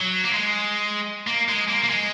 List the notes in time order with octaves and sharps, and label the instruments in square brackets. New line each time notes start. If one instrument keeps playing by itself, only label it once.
[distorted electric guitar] F#3
A#3
G#3
A#3
G#3
A#3
A#3
G#3